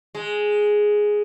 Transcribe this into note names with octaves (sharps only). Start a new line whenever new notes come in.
G#3